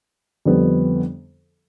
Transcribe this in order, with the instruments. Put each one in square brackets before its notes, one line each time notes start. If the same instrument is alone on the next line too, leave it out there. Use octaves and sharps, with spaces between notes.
[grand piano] F2 D3 G3 B3